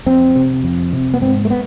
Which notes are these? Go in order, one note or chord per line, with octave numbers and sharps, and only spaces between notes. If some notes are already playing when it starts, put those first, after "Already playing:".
F2 C4
C3
F2
C3
B3
G#2 C4
A3
B3